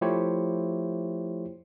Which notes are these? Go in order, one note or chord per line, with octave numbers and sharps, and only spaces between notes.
F3 A3 E4 G4 C5 C#5